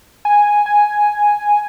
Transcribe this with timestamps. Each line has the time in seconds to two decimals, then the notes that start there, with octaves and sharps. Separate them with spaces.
0.25 G#5
0.66 G#5